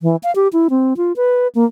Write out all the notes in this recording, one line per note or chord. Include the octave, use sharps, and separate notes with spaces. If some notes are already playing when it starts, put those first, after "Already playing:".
E3
F5
G4
E4
C4
F4
B4
A#3